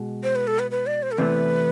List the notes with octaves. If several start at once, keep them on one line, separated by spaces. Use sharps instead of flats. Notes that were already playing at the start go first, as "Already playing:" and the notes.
Already playing: B2 G#3
C5
B4
A4
B4
B4
D5
C5
A4
E2 C3 E3 A3 B4